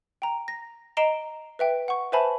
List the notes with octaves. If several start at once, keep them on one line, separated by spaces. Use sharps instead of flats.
G5 A#5
A#6
D#5 A#5 C7 D7 E7 G7
B4 E5 G5
F#5 C#6
B4 C5 E5 G#5 A5 B5